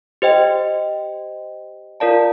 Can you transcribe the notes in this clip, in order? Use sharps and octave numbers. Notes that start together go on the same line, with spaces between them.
G4 C5 D#5 G5
F4 A#4 D5 F5 A5